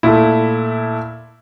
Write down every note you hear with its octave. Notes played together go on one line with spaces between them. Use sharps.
A#2 A3 E4